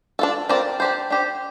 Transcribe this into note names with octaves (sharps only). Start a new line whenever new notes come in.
D4 F4 A4
C4 F4 A#4 D5
D4 G4 C5
D4 G4 C5